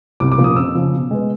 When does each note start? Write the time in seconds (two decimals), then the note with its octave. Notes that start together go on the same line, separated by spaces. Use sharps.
0.20 C2 D6
0.32 D6
0.38 A#2 F3 A#3 C#4
0.44 D#6
0.56 F2 E6
0.75 C#3 F3
0.93 B2
1.11 G#3 B3